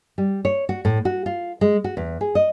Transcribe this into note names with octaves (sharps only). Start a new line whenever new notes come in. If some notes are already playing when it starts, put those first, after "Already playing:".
G3
C#5
F#4
A2
F#4
F4
G#3
F#4
E2
G#4
D#5